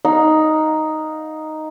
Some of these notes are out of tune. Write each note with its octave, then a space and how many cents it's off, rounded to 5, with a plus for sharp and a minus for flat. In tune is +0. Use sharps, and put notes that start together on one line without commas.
D#4 +0 F5 +35